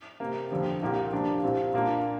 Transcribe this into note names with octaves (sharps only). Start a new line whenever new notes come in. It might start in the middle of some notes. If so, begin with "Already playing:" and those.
C3 G3 A#3
F2 D3 F3 C4 G4
C2 A#2 A#3 G4
G2 F3 A#3 D4
C2 A#2 G3 C4
A#2 A#3 D4 F4